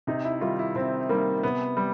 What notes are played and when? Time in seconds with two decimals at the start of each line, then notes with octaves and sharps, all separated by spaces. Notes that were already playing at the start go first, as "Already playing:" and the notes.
0.07 C3 D#4
0.25 E4
0.41 D#3 G3 F4
0.59 E4
0.75 C3 C4
1.09 D#3 G3 A#3
1.43 C3 B3
1.77 G3